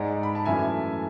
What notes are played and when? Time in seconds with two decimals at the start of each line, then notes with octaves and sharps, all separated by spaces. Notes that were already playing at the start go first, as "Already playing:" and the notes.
Already playing: G#2 G#3 D5 F#5
0.23 B5
0.35 A5
0.45 F#2 E3 A3 E5 G#5